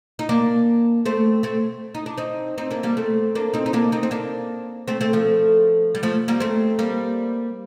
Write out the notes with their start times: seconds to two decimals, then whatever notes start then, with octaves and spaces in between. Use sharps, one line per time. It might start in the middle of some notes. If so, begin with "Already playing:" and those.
0.19 D#4
0.29 A#3 D4
1.05 A3 C4
1.43 A3 C4
1.95 D#4
2.06 D4
2.17 C4 D#4
2.58 C4 D#4
2.71 A#3 D4
2.83 G3 A#3
2.97 A3 C4
3.35 A#3 D4
3.54 C4 D#4
3.66 D#4
3.73 A#3 D4
3.92 C4 D#4
4.03 C4
4.11 A#3 D4
4.88 A3 C4
5.01 A3 C4
5.13 F3 A3
5.95 G3
6.03 F3 A3
6.28 G3 A#3
6.40 A3 C4
6.79 G3 A#3